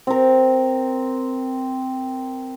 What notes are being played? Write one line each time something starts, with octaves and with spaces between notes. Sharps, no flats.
C4 A#4